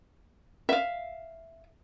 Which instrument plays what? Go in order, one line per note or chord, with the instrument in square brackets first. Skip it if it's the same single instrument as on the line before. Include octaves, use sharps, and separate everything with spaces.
[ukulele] E5 F5